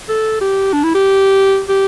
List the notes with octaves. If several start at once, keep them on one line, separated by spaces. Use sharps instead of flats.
A4
G4
D4
E4
G4
G4